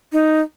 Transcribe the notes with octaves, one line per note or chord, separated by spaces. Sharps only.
D#4